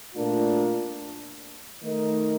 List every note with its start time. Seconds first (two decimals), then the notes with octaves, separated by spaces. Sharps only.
0.15 A#2 A3 D4 F4 A#4
1.83 D#3 A3 D#4 A#4